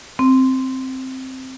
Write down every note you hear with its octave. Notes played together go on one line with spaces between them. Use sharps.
C4